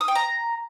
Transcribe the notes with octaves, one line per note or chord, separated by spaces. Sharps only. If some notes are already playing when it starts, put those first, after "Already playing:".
D#6
G5
A#5